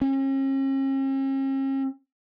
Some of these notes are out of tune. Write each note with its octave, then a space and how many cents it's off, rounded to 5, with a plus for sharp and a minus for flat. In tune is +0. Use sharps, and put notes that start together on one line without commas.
C#4 -45